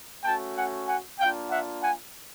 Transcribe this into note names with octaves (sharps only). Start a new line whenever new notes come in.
A3 C#4 F#4 G5 A5
F#5 G#5
F#5 G#5
A#3 D4 F4 F5 G5
E5 F#5
F#5 G#5